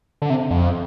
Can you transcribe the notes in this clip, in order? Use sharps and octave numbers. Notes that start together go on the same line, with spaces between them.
D3
C3
F2